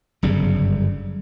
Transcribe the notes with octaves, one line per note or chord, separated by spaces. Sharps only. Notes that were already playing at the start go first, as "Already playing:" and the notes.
G1 F#2 C#3 G3